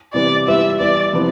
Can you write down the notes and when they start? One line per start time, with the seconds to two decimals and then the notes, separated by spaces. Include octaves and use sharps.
0.14 C3 E3 G3 B3 D5
0.47 E3 G3 B3 F4 E5
0.79 E3 G3 B3 D5
1.13 C3 F3 B3 E4